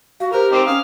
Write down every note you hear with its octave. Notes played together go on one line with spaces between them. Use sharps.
F#4 F5
G4 A#4 C5 A#5
C4 D#4 D6 C7 D7
C#4 F5 D#6